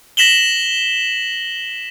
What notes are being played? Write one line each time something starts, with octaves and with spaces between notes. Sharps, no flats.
A#6 B6 E7 F#7 G7